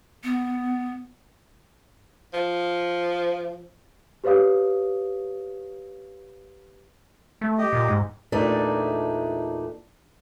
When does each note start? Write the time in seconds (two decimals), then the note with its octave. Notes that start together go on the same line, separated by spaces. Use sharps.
0.24 B3
2.34 F3
4.24 G4 B4 C#5 F5 D#6
7.41 A3
7.58 G4 D#5
7.73 A#2
7.88 G#2
8.32 E2 A#2 A3 D4 D#4